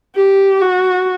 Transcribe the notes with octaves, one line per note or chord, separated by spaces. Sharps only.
G4
F#4